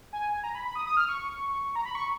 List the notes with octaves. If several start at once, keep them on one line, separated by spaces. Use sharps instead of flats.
G#5
G#5
A#5
B5
B5
D#6
D#6
F6
C#6
A#5
B5
C#6